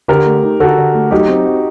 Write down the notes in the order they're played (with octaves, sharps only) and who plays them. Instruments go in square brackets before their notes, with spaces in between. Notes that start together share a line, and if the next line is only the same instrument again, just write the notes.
[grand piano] D3 [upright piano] G4 A#4
[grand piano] A3
D#4
[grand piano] D3 [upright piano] F#4 A4
[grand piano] D3
A3
[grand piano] F#3 [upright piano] D#4 G4
[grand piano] C4
F#4